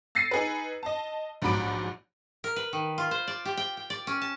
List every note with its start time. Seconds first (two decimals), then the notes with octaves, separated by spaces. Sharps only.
0.15 E6 A6 A#6 C7 C#7 D#7
0.31 D#4 G#4 B4
0.83 D#5 A5
1.42 A#1 G#2 F#3 B5 D6 D7
2.44 A#4
2.56 B4
2.73 D#3
2.98 F4
3.11 C5
3.28 D5
3.45 G4
3.57 G5
3.77 G5
3.90 D5
4.07 C#4
4.21 A5